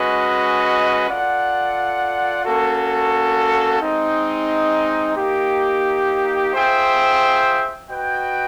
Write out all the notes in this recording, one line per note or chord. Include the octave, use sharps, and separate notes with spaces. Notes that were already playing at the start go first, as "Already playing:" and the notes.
Already playing: G#3 C#4 F#4 B4 D#5
F4 A4 D5 F#5
A#3 C#4 F#4 A4
G#3 C4 D#4
A#3 D#4 G4
F4 G#4 C5 E5 G5
F#4 B4 D#5 G5